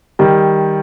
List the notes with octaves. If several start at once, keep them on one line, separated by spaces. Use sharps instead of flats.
D#3 G3